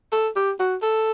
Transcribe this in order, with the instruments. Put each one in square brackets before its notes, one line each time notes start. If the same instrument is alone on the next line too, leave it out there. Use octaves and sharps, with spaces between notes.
[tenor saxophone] A4
G4
F#4
A4